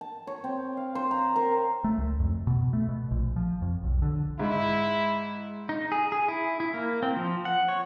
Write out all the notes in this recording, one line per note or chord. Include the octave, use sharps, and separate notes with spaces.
A5
C#5
C4
F5
C5
A#5
A#4
A3
C#2
F2
B2
A3
B2
A#1
F3
F2
B1
D3
G#2 E4
D#4
G#4
G#4
E4
E4
A#3
C4
F3
F#5
C#5